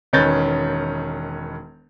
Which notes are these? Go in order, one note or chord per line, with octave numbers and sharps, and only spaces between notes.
E1 D#3 C#4 B4 G6 A6